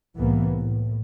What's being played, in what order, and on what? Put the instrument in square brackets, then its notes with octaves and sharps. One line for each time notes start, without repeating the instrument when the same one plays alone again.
[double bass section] C2 A2 E3 A#3 B3
A2